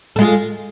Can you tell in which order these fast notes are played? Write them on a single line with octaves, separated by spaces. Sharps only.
A4 G#3 F4